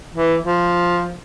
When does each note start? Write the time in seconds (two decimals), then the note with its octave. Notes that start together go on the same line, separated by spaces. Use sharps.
0.15 E3
0.44 F3